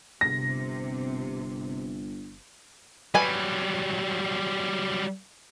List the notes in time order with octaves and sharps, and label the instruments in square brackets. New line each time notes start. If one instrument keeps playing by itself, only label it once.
[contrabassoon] G1 [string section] C3 [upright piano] A#6
[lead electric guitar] F#3 G3 [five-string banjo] B4 G#5